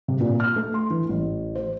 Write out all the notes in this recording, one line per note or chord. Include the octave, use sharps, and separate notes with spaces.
C3
A#2
F6
A3
C6
E3
A1
C5